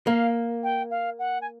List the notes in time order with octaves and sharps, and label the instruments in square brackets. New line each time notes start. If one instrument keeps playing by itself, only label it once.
[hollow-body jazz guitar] A#3 [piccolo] F5
[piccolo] G5
F5
F#5
G#5